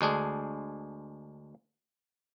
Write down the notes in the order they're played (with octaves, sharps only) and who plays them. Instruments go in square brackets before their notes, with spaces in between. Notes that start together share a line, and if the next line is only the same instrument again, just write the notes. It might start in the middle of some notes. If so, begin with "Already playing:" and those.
[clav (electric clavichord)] D2 G#3 D4 G#4